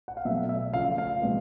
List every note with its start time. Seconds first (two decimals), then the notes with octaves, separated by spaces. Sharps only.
0.08 F#5
0.17 F5
0.25 B2 F#3 A3 E5
0.38 E5
0.49 E5
0.73 C#3 F3 A3 F5
0.98 F5
1.22 B2 G#3 B3